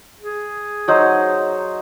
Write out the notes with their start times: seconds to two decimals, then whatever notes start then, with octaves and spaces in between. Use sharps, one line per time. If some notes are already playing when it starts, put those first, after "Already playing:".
0.21 G#4
0.88 F#3 D#4 C5